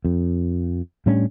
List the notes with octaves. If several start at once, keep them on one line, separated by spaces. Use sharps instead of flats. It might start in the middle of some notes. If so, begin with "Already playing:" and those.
F2
A2 G3 C#4 D4